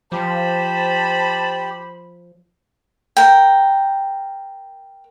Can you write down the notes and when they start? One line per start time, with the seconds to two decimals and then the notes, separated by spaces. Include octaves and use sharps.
0.12 F3 G4 C5 A5 B5
3.17 A#4 G5